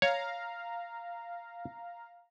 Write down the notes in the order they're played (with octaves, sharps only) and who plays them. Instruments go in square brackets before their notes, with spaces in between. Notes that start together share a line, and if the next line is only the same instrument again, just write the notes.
[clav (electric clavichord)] C#5 [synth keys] F5 A#5